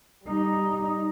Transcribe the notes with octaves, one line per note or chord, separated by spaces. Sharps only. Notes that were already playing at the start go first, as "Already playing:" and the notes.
G3 D#4